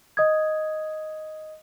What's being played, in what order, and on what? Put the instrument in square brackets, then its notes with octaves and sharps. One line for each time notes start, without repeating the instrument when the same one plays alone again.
[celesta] D#5 D#6 G#6